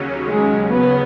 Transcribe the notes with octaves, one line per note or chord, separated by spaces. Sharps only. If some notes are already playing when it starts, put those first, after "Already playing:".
Already playing: D#2 C#3 F#3 C#4
G#3
B3